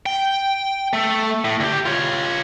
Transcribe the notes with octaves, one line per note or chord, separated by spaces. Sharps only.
G5
A3 A4
A2
D2 G4
F4 C#5